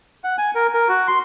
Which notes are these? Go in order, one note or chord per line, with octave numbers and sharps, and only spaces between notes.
F#5
G#5
A#4
A#4
F#4
C6